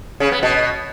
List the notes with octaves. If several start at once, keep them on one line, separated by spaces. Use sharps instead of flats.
C#3
B3
B2